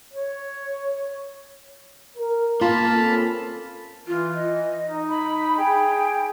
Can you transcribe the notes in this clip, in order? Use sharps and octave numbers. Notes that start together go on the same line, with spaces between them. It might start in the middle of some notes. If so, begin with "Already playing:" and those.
C#5
A#4
A#3 F4 A5 B5
C4 C#4 A4
E3 F4
D#5
D#4
B5
G#4 G5